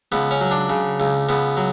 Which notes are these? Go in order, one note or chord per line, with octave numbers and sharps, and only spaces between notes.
C#2 B3
C#4
F#3
D4
C#3
C#2
C#2 B3
F#3